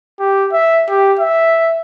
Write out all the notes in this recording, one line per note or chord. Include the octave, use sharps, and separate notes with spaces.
G4
E5
G4
E5